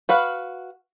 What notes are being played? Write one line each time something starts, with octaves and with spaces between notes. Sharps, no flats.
F#4 B4 F5